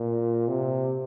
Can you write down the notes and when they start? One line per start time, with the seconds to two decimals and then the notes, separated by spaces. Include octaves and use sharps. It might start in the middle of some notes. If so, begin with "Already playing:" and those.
Already playing: A#2
0.48 C3